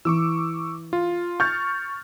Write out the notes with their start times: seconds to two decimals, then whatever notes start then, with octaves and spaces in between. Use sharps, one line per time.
0.05 E3 C#6 D6 E6
0.93 F4
1.40 C#6 F6 G6 A6